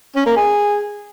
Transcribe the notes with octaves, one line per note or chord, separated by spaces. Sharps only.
C#4
A#3
G#4